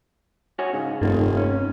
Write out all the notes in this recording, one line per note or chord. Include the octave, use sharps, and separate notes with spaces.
F#4 C#5 G#5
G#2 C#3
F1 G2 D#3 A3 A#3
C#4